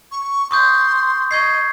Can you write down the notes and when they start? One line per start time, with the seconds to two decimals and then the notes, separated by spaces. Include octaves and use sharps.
0.11 C#6
0.51 C6 C#6 D#6 G6
1.31 D#5 C#6 G#6 C7